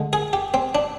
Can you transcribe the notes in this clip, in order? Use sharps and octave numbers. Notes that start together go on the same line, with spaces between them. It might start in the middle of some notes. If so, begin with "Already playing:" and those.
Already playing: D3 G#3
G#4
G4
C4
D4